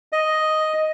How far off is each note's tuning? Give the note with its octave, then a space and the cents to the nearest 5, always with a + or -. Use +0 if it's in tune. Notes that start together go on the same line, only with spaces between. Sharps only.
D#5 +5